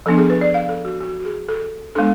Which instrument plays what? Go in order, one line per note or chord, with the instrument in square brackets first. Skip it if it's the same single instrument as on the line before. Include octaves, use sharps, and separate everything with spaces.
[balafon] F3 B3 D4 A4
G#4
B4
D5
F5
A4
F#4
F#4
F#4
G#4
A4
G#3 B3 D4 A4